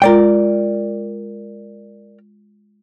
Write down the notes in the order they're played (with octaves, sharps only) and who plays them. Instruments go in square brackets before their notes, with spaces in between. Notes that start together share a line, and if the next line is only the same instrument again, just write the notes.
[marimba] G#3 F4 [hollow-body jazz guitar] A#4 D5 G5